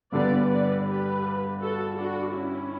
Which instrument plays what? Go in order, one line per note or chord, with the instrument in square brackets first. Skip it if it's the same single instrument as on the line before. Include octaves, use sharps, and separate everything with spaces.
[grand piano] G2 D3 G3 B3 [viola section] B4 D5
[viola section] B4 D5
G4 B4
F#4 A4
D4 F#4
C#4 E4